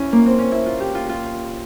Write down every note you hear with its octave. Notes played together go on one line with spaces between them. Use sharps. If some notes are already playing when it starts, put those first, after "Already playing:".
Already playing: C#4 E4
A#3
C4
C#4
E4
F4
G4
F4
F4